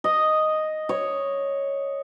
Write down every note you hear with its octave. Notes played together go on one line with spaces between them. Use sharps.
D#5
C#5